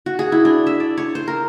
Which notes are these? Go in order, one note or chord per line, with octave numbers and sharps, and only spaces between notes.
F#4
G#4
E4
D4
E5
D5
C#5
C5
A#4